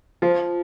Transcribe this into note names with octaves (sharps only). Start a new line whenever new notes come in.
F3 F4